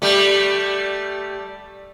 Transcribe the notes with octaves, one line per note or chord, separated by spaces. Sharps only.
G3 A3